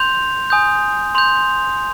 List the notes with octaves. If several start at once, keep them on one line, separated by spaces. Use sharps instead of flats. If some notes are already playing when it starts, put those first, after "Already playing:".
Already playing: C6 G6 F7
G#5 D#6 G6
C6 G6 F7